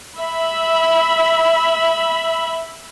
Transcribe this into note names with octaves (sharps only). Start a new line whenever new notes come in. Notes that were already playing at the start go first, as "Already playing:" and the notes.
E5 B5